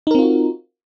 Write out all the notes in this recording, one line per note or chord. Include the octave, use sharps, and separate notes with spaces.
C4 D#4 F4 F#4 A#4